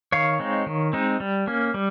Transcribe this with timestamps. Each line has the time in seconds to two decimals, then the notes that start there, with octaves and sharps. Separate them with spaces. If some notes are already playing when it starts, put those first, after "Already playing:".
0.12 D#3 C#5 F5
0.39 G#3 C4 D#4
0.66 D#3
0.93 G#3 C4 D#4
1.20 G3
1.47 A#3 C#4
1.74 G3